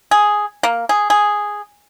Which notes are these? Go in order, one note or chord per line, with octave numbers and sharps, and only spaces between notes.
G#4
A#3
G#4
G#4